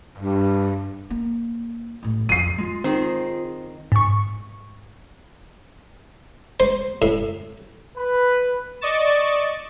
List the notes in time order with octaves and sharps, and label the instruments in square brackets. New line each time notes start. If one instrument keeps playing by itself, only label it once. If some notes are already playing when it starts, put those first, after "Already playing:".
[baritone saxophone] G2
[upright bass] A#3
A1 A2
[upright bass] F2 [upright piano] C7 D#7
[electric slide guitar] G#3 F4
[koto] D#3 [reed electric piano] C4 [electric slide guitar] F4 G#4 C5
[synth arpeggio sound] G#2 C#6
[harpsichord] C5
A2
[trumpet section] B4
[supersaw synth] D5 D#5 C#6 A6 E7